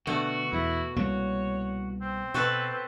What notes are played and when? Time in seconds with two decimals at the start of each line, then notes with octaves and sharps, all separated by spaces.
0.07 B2 D3 A3 F#4
0.53 E2 E4
0.96 C2 A#3 C#5
2.01 C4
2.34 B2 F#4 A4 B4